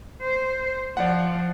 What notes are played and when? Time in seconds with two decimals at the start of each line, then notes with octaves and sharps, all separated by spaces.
0.22 C5
0.97 F3 D5 F#5